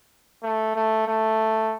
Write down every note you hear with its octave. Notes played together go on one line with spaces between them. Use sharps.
A3
A3
A3